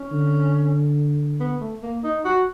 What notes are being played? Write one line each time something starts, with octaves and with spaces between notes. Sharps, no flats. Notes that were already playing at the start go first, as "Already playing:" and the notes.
Already playing: C#4
D3
B3
A3
A#3
D#4
F#4